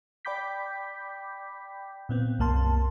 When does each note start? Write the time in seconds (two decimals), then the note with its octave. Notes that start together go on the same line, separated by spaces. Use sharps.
0.25 D5 G5 B5 D6 G6 B6
2.09 A#2 B3 C4
2.39 C2 F#2 A#3 A5 C6